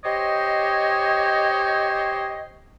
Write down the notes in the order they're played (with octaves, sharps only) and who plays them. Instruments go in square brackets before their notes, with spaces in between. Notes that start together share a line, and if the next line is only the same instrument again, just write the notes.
[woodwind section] G4 C5 C#5 D#5